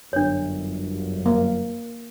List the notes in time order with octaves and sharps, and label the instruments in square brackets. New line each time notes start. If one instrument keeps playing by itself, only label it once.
[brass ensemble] G1 F#2 [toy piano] D4 C#5
[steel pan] A#3